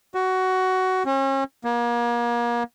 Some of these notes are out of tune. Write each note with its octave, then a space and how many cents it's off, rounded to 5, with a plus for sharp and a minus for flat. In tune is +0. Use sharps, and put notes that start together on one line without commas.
F#4 +15
C#4 -40
A#3 +35